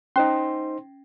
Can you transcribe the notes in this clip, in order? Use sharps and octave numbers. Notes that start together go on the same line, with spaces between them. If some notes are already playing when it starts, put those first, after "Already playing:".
C#4 D#4 C5 C6